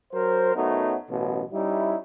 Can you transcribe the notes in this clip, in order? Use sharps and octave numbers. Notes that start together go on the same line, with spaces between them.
F#3 A#4 C5
F#2 F#3 A3 B3 D#4
A1 F#2 B2
G3 C#4 D#4 E4